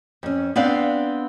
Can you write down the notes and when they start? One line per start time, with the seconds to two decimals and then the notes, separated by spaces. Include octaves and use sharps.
0.23 F2 C#4
0.56 B3 C4 D4 D5 F5